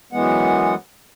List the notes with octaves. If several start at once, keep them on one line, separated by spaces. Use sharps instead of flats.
F#2 E3 G#3 B3 F#5